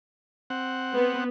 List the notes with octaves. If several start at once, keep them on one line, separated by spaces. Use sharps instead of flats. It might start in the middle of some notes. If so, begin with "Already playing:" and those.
C4 F#5
B3